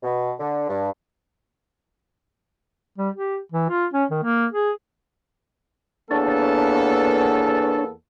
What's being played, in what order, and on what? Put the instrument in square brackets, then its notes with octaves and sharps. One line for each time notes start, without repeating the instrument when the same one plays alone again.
[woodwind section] B2
D3
G2
[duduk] G3
G4
E3
F4
C#4
D#3
A#3
G#4
[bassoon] E2 [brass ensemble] A#3 B3 A4 [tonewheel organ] D4 C#5 A5